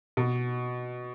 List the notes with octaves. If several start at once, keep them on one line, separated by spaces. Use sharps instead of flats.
B2